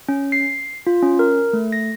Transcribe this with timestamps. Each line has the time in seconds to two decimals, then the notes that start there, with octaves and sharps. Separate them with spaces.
0.09 C#4
0.32 C7
0.87 F4
1.03 C#4
1.19 A#4
1.53 A3
1.72 A#6